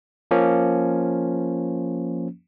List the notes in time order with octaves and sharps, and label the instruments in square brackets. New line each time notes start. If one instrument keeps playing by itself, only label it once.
[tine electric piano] F3 A#3 C#4